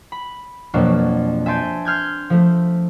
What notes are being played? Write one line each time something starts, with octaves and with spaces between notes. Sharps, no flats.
B5
F2 B2 F#3 A#3 D4
E5 G#5 A5 C6 G6 D7
C6 F6 G6 G#6
F3 A3